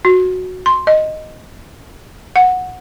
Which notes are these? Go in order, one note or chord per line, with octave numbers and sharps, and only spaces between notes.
F#4
C6
D#5
F#5